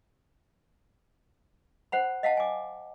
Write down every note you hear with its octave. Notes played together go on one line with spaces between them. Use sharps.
C5 F#5 B5
D#5 F5 F#5 A5
G#5 D6